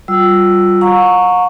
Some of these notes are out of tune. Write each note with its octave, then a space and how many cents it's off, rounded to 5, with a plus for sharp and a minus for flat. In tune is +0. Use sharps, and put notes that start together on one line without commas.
G3 -25 F4 +20 E6 +0
F#5 -45 A#5 -15 C#6 +0